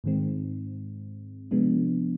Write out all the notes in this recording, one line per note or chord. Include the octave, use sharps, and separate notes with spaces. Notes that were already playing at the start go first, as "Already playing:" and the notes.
G#2 D#3 G#3 C4
C3 F3 G#3 B3 D4